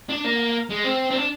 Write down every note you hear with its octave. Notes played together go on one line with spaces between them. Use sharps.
D4
A#3
G#3
C4
C4
D4